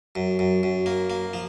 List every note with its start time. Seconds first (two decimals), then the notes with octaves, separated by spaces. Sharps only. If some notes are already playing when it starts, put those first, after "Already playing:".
0.15 F#2
0.39 F#2
0.63 F#2
0.86 A#3
1.10 A#3
1.33 F3